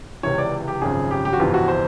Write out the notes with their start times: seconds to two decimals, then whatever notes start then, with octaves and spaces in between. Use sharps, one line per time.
0.23 C#2 C3 E3 C#5
0.38 D5
0.68 G4
0.81 G#1 F#2 C#3 F3 G#4
1.11 G4
1.25 G4
1.33 F#4
1.39 G1 F2 C3 E3 F4
1.54 F#4
1.68 C5